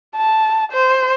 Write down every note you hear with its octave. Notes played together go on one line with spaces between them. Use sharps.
A5
C5